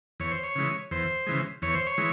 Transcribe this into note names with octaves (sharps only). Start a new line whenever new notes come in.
E2 C#5
C5
C#5
C#3 E3 G#3
E2 C5
C#3 E3 G#3
E2 C#5
C5
C#5
E3 G#3